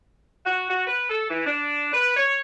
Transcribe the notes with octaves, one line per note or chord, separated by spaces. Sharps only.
F#4
F#4
B4
A4
E3
D4
B4
C#5